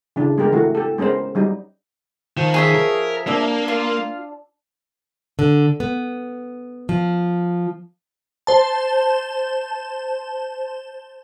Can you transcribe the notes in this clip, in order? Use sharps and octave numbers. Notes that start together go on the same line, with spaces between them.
C#3 E3 D4
G#3 B3 G4 A#4
E3 A3 F#4
G4 A4
G#3 B3 C#4 A#4 C5
F#3 G3 D#4
D#3 F3
G#4 C#5 E5
A#4
A#3 D4 E6
F4
D3
B3
F3
C5 A5